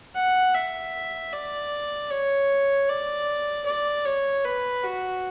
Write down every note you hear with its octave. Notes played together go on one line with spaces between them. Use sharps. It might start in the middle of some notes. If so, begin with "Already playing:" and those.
F#5
E5
D5
C#5
D5
D5
C#5
B4
F#4